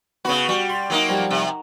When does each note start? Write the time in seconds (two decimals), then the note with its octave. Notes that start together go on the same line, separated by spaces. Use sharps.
0.25 C#3 B3 F#4 B5
0.49 G3 F#4
0.70 C6
0.90 F#3 A#3 D#4
1.09 F3 G3
1.31 C3